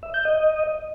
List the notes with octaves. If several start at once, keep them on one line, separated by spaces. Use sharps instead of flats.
E5
G6
D#5